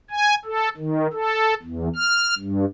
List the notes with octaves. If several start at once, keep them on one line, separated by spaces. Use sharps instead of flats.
G#5
A4
D#3
A4
E2
F6
G2